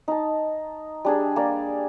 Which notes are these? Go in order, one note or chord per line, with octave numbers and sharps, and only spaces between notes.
D#4 A5
G3 D4 G#4
A#3 D5